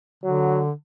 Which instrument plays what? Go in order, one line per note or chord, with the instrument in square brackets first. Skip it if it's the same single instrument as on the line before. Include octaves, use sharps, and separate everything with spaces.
[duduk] D3 [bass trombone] F#3